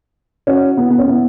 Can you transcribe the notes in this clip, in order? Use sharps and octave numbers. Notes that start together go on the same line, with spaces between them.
C#4 F#4
B3 E4
B3
C#4
B3 E4